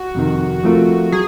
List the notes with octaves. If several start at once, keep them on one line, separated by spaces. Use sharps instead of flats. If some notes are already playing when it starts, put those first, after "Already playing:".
Already playing: F#4
F2 C3 D#3
F3 A3 C4 F4 A#4
F#3 G#4